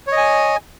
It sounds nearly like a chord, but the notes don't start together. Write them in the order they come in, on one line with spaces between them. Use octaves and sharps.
C#5 D#5 G#5